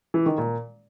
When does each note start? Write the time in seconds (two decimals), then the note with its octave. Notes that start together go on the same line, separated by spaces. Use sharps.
0.14 E3
0.26 D#3
0.38 A#2